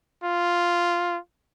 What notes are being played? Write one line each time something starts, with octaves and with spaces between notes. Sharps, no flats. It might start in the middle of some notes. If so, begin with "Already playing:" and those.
F4